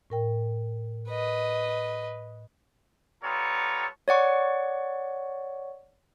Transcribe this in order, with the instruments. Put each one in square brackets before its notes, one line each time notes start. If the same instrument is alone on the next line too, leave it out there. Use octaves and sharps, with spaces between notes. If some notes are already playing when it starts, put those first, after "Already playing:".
[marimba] A2 A#4 G5
[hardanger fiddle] B4 D#5
[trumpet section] G3 B3 F4 A4 C#5 A#5
[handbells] C#5 D5 F#5 C#6